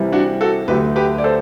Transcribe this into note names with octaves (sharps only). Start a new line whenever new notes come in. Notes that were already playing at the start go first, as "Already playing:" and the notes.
Already playing: C2 C3 E3 G3
D4 F#4
F#4 A4
D2 D3 F#3 A3 G4 B4
G4 B4
D5
A4 C5